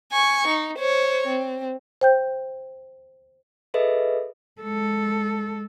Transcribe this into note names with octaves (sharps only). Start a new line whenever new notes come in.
G#5 C#6
D#4
C5 C#5
C4
C5 G5 G6
G#4 A4 B4 D#5 E5
G#3 A4